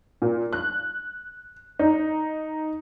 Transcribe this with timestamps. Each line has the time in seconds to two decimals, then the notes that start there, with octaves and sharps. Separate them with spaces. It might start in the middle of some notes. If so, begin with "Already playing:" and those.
0.22 A#2
0.53 F#6
1.79 D#4